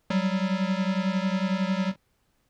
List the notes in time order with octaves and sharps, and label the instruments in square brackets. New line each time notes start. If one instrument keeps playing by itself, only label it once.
[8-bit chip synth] F#3 G3